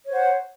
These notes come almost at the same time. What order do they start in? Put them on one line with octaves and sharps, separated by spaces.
C#5 C5 F#5